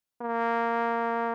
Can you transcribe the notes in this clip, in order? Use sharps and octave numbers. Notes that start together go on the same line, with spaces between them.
A#3